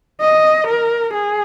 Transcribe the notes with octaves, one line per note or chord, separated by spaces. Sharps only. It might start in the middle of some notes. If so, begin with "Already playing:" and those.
D#5
A#4
G#4